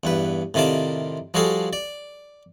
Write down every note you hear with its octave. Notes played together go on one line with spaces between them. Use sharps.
E2 G2 B4
A2 C3 D#3 F4 D5 A5
F3 G3 F#4 G#4 A4 F5
D5